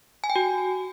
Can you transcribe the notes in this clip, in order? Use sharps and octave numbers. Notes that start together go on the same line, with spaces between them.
G#5
G5
F#4